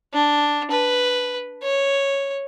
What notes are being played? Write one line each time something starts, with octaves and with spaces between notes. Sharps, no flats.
D4
B4
C#5